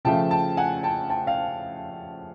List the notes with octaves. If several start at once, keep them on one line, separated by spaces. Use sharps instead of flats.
C#3 F3 A3 G5 A5
G5 A5
F#5 G#5
G5 A5
G5 A5
F5 G5